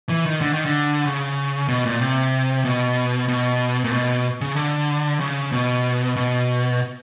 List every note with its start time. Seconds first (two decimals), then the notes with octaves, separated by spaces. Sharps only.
0.09 E3
0.26 D#3
0.41 D3
0.53 D#3
0.66 D3
1.05 C#3
1.68 B2
1.86 A#2
2.01 C3
2.65 B2
3.28 B2
3.84 A#2
3.93 B2
4.41 C#3
4.56 D3
5.20 C#3
5.52 B2
6.16 B2